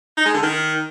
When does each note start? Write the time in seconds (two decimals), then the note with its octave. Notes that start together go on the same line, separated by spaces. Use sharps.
0.17 D#4
0.26 G#3
0.34 D3
0.42 D#3